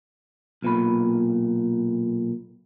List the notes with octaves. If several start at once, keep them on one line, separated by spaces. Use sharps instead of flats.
B1 A#2 B5